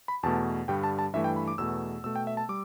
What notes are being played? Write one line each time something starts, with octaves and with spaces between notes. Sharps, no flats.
B5
E2 B2 A3 A5
G2 D3 G3 G5
A5
A5
G2 E3 A3 E5
G5
B5
D6
E2 B2 A3 E6
B2 A3 E6
G5
E5
A5
G3 D6